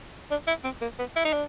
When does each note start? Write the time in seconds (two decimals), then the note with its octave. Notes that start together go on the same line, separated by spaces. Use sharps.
0.31 D4
0.47 E4
0.64 C4
0.81 A#3
0.99 B3
1.16 E4
1.25 D#4
1.33 D4